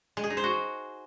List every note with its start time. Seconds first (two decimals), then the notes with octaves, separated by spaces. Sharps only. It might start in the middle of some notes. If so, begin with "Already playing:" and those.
0.17 G#3
0.24 G#4
0.30 D#4
0.37 C5
0.44 F#4